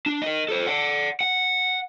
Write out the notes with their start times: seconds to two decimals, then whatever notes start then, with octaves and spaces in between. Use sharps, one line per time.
0.06 D4
0.22 A#4 D#5
0.49 A4 C5
0.67 D5 F#5
1.21 F#5